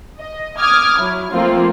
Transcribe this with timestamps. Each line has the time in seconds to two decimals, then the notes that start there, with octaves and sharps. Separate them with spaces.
0.18 D#5
0.58 D6 D#6 F6 G#6
0.99 F#3 E4
1.32 F3 A3 A#3 C4 F4